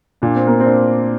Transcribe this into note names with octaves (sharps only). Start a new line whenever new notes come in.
A#2 D4
C4
A#3
C4
D4